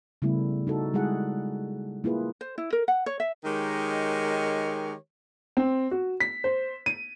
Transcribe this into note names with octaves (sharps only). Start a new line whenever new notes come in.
C#3 G3 A3 B3 E4
D#4 F#4 A4
G3 G#3 E4 G#4 F#5
A#3 E4 F4 G#4 B4
C5
E4
A#4
F#5
C#5
E5
D#3 G#3 D#4 G4 A#4 C#5
C4
F#4
B6
C5
D#7